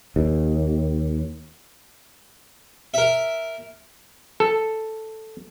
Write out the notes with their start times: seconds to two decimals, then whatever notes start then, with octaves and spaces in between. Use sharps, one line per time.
0.16 D#2
2.94 A#4 E5
4.40 A4